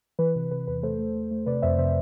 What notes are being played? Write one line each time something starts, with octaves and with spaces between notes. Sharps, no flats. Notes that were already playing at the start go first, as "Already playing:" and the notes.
E3 B4
C3
C3 B4
E2 B4
A3 A4 C5
A3
A3
A3
C3 B4 D5
F2 C5 E5
C3 C5 E5